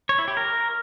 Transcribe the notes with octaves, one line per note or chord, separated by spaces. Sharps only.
C#5
E4
G4
A#4